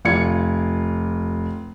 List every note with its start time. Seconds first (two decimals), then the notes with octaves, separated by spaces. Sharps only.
0.05 F1 F4 D5 G#6 C#7